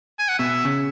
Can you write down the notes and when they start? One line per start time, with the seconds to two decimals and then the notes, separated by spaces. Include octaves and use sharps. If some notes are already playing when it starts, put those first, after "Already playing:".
0.19 G#5
0.29 F#5
0.39 B2 E5
0.65 C#3